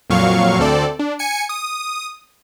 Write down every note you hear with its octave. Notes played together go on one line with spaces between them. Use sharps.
F2 A#2 F#3 F5 C#6
D2 C4 A4 D5
D4
G#5 C#7
D#6